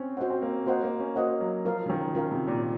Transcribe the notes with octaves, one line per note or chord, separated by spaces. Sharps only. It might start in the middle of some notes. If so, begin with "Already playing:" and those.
Already playing: C4 C#4
C4 F#4 C5 D#5 F#5
C4
A#3
A#3 F#4 C5 D#5 F#5
A#3
C#4
A#3 F#4 C5 D#5 F#5
F#3
F3 F4 A#4 F5
C#3
D#3
C#3 F4 A#4 F5
C3
A#2